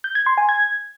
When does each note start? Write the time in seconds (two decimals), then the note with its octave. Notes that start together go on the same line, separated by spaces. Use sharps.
0.04 G6
0.15 G#6
0.26 C6
0.38 G#5
0.49 G#6